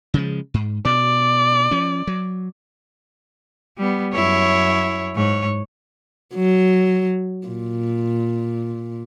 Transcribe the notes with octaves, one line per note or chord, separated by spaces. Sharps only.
C#3 F3 G#3
G#2
B2 D5
F3 C#4
F#3
G3 B3
F#2 E4 C#5
G#2 C#5
F#3
A#2